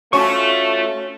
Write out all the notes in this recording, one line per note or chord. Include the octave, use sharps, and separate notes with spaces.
A3 C#4 F4 F#4 A5 C#6